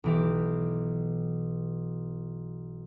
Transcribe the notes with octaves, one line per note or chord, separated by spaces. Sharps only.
B1 E3 G4